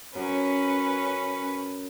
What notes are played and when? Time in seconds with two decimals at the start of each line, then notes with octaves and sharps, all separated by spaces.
0.15 F#2 C#4 B4